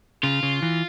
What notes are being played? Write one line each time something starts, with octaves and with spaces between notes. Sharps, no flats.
C#3 F4
C#3
E3